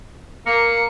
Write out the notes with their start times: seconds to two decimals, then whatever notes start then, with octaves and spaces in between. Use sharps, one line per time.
0.46 A#3 C#7